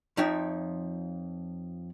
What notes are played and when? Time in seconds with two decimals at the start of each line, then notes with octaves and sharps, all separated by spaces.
0.17 F2 F3 D#4 C#5 E5 G5